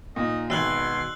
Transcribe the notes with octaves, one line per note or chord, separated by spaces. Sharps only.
A#2 D#4 D#5
G#1 B2 C6 E6 F#6 F#7 G7